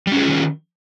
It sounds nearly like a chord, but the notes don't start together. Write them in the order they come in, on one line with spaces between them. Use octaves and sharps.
G3 C#4 G#4 F4 D#3